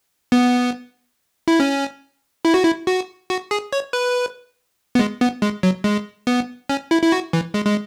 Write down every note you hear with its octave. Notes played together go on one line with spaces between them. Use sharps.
B3
E4
C#4
E4
F#4
E4
F#4
F#4
G#4
C#5
B4
B3
G#3
B3
G#3
F#3
G#3
B3
C#4
E4
E4
F#4
E3
G#3
G#3